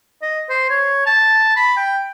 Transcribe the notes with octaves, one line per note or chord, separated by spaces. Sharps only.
D#5
C5
C#5
A5
B5
G5